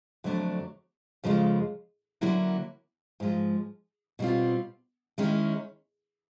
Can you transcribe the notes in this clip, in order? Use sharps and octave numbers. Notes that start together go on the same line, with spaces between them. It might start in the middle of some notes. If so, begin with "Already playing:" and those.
F2 D3 F#3 A3 D4
F2 C#3 F3 G#3
D3 F#3 A#3 C#4 E4
G#2 F3 G#3
B2 G3 C4 F4
D#3 G#3 C#4 E4